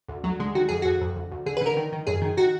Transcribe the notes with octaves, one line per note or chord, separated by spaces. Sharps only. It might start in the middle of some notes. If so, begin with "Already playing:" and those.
D2
D2 F#3
D3 G#3
D#3 F#4
F2 G#4
F2 F#4
F2
D2
D2
D3 G#4
B4
D3 A#4
D#3
D#3
F#2 G#4
D#3
D#3 F#4